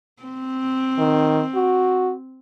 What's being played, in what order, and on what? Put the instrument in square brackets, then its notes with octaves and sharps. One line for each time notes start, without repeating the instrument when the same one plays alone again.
[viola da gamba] C4
[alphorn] D#3
F#4